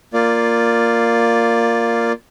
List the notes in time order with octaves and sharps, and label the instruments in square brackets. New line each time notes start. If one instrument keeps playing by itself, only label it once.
[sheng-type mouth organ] A#3 F4 D5